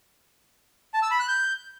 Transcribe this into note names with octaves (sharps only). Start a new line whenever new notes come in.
A5
E6
B5
F#6
G6